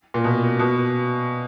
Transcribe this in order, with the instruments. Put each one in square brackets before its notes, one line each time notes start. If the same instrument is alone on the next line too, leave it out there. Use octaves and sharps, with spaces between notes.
[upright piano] A#2
B2
B2